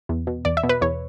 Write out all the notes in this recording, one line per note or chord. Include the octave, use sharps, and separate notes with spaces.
E2
B2
E2 D5
E5
B2
B4
E2 C#5